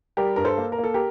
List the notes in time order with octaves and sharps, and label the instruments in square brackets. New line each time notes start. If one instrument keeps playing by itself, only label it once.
[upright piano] G3 G4 A#4
G2 A#4
A4 C5
A#3
A#4
A#3
A4
G4 A#4